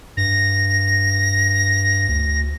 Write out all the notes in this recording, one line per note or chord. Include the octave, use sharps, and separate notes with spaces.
G2 A#6
D2